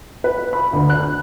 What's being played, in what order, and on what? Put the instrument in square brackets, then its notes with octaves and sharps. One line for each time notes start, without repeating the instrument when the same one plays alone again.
[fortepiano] B4
B5
D2
F#6